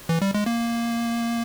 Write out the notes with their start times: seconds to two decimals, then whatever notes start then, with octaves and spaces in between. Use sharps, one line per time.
0.09 E3
0.22 G3
0.35 G#3
0.46 A#3